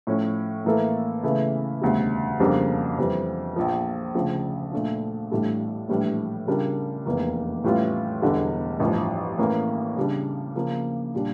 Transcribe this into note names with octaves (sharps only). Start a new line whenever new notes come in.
A2 F3 C#4
A2 E3 A#3 E4 A4
C#3 E3 A3 E4
E1 D2 C#3 G3
F2 C#3 G3 A#3 D4
F2 E3 G3
A#1 A#2 F3
D2 C#3 F3
A#2 A3 D4
A1 A2 G3 D4 A4
A#1 A2 E3 G3 D4
C#3 G3 D4 F4 A#4
F1 E2 E3 A#3
A2 E3 G3 C#4 F4
E1 E2 D3 G3 D4
A1 G2 F3
A2 E3 A#3 C#4 E4
C#3 G3 D4
C#3 F3 A#3
A#2 G3 D4